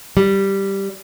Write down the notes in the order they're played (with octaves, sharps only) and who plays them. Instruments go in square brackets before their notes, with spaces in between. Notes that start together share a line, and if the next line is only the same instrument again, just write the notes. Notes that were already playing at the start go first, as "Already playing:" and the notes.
[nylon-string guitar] G3